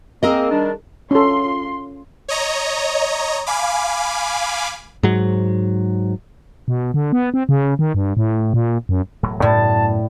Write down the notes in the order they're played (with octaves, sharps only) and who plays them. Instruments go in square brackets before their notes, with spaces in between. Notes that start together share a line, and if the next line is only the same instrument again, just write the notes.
[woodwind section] A#3 C4 [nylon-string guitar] G#4 A#4 D#5
[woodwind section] D#3 G3 D4
[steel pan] C#4 A4 [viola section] F4 C6
[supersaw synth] C#5 D#5 A#5
F5 G#5 B5 D6
[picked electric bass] G#2 F#3
[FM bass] B2
D3
B3
C4
C#3
D#3
G2
A2
A#2
F#2
[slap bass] E1 A2 F#3
[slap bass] F#2 B3 [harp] A2 [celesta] D5 [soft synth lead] A5